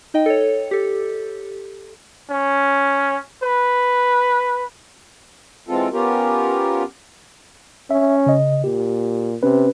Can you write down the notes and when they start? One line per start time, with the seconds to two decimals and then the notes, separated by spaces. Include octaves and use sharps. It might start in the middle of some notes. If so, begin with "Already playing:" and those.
0.14 D#4 D#5 G5
0.26 A4 C#5
0.71 G4 A4
2.30 C#4
3.43 B4
5.68 E3 G#3 C4 F4 A4
5.92 B3 C#4 F4 G4 A#4
7.91 C#4 E5
8.26 C#3 D#5
8.64 A#2 G4
9.43 C3 C#4 B4